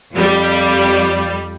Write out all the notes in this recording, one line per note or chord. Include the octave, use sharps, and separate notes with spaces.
F2 G3